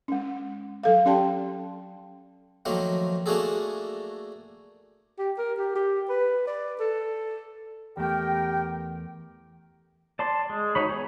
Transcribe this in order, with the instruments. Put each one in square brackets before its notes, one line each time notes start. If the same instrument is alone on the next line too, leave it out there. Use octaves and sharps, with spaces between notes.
[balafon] G#3 C#4
F#3 A4 F5
C#4 G4 D5 G5 A5 C6
[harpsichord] D#3 F3 F#3 A3 A#3
A3 A#3 D4 F#4 G#4 A4
[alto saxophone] G4
A#4
G4
G4
B4
D5
A4
[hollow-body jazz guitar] E2 A3 [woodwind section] G4 A#4 G5
[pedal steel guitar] D5 A5 C6
G#3
D#4 F#4 C#5 B5
B3 G#4